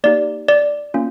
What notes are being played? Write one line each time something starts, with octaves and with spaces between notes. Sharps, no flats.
A#3 D#4 G4 D5
D5
A#3 C#4 F4